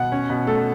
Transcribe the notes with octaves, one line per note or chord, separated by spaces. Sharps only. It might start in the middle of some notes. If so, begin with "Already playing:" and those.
Already playing: B2 F#5
C#4
B2
A3 A4